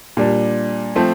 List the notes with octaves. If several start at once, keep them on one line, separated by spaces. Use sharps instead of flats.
A#2 G3 D4
F3 A3 C4